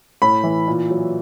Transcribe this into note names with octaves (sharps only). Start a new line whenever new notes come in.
A2 B5
E3
A#2
F#3